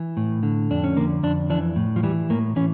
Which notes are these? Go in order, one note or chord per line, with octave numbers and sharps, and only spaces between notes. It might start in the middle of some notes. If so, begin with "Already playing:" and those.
Already playing: E3
A2
D3
F2 D4
C#4
D3 A#3
F2 D4
E3 D4
A2
F3
E3 G3
A2 A#3
E3 C#4